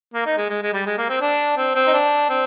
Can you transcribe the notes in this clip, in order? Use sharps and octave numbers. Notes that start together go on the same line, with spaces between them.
A#3
D#4
G#3
G#3
G#3
G3
G#3
A#3
C4
D4
C4
C4
D#4
D4
C4